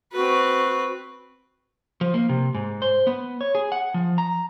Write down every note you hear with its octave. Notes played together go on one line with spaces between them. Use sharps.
C4 F#4 B4
F3
A#3
C3
G#2
C5
B3
C#5
G#4
F#5
F3
A#5